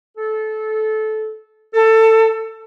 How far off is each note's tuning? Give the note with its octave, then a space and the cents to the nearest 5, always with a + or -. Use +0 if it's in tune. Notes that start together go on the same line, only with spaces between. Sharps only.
A4 -20
A4 +20